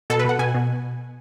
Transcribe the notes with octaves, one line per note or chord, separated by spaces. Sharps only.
B2 A4
B4
B2 F#5
B2 G#5
B2